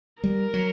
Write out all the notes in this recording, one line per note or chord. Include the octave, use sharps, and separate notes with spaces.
G3 A#4
F#3